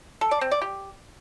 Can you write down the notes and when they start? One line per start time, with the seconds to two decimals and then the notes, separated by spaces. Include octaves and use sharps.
0.21 A4
0.31 D5
0.41 C4
0.51 D5
0.62 G4